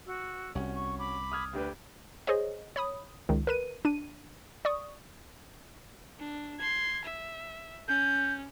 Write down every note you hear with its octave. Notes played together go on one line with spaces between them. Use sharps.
F#4 E6
C2 C#4 F#4
C#6
B5 D6
D#6 F6 G#6
D2 D4 G4 B4
G#4 C5 C#5 D#5
C#5 B5 D#6
C#2 D#3
A#4 B4 D#7
D4 D#7
D5 C#6 D#6
D4
C6 G#6
E5
C#4 G6